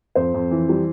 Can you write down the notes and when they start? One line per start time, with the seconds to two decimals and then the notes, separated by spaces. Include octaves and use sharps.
0.15 F2 C5
0.34 F2
0.51 E3
0.69 G3